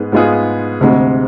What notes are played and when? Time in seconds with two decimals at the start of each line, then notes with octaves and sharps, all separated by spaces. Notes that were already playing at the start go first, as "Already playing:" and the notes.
Already playing: G#2 G#3 B3 G#4
0.12 G#2 G#3 B3 F4 G#4
0.81 D2 C3 G#3